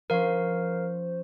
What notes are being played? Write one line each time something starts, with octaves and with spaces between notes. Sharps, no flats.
F3 C#4 A#4 C5 F5